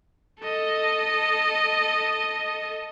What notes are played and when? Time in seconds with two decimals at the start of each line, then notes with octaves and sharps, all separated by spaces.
0.41 A4 D#5